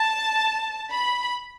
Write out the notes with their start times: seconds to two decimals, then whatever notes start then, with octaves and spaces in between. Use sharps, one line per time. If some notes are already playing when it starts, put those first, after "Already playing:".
Already playing: A5
0.91 B5